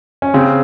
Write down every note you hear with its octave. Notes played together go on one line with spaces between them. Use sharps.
C#4
C#3 C4